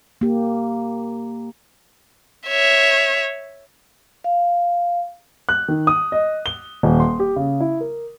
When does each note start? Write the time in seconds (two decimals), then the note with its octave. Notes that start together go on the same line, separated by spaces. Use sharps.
0.21 A#3 G4
2.47 C#5 E5
4.24 F5
5.49 F#6
5.68 D#3
5.87 D#6
6.12 D#5
6.46 G7
6.83 D#1
7.00 C6
7.20 G4
7.36 C#3
7.60 E4
7.81 A#4